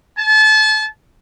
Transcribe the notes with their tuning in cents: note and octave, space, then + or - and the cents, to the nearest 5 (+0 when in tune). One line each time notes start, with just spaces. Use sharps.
A5 -30